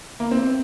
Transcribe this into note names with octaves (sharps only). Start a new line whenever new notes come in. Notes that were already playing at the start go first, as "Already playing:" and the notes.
A#3
C4
C4